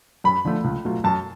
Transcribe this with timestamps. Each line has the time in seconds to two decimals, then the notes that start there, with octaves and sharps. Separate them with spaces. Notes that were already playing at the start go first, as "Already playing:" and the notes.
0.24 F#2 B5
0.45 D3 F3 A3
0.64 C#2
0.85 B2 F#3 A3 F4
1.04 F#2 A5